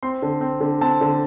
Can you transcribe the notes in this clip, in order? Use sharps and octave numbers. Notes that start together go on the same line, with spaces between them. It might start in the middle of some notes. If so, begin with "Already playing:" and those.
C4 C6
D3
C4
D3
C4 A5
D3